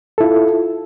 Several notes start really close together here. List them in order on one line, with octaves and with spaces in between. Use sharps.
A4 E4 F4